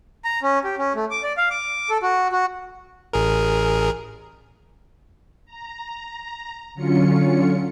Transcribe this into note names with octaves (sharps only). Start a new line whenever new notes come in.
A#5
C#4
G4
C#4
A3
D6
D5
F5
D6
A4
F#4
F#4
A1 G#4 A#4
A#5
D3 F#3 C#4 F4 C#7